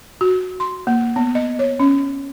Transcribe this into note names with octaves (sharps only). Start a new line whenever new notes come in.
F#4
C6
A#3
B3
D#5
C#5
C#4